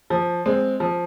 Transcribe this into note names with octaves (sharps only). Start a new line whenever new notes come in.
F3
G#3 C4
F3